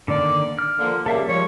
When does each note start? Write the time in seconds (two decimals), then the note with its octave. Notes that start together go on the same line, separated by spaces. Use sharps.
0.08 D3 D#3 A#3 D5
0.59 F6
0.79 D3 F3 A#3
1.06 C#3 G3 A#3 A4 E5 F5
1.29 F3 G3 G#3 C#5